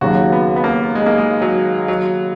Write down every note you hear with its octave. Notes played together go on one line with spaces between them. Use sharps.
D#2 C#3 F#3 F#4
B3
B3
A#3
G#3
A#3
G#3
F#3
F#3